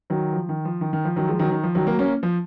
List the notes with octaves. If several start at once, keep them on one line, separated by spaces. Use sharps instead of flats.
D#3 F#3
F3
D#3
F3
D#3
D#3
F3
D#3 F#3
F3 G#3
D#3 F#3
D#3
F3
D#3 F#3
F#3 A#3
A#3 C#4
F3